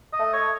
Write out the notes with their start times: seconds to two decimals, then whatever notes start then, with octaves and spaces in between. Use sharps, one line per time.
0.13 D#5
0.19 A3
0.33 C#5